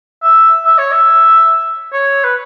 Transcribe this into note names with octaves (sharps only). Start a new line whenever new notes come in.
E5
E5
C#5
E5
C#5
B4